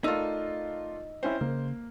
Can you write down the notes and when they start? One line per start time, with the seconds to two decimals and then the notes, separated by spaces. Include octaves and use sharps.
0.04 A3 D#4 F4 A#4 D5 E6
1.23 C4 C#4 E4 C5
1.41 C#3 A#3